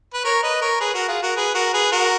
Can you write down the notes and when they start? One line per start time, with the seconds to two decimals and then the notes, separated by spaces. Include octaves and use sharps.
0.14 B4
0.24 A#4 C#5
0.43 B4 D#5
0.61 A#4 C#5
0.80 G#4 B4
0.94 F#4 A#4
1.08 F4 G#4
1.22 F#4 A#4
1.36 G#4 B4
1.54 F#4 A#4
1.73 G#4 B4
1.92 F#4 A#4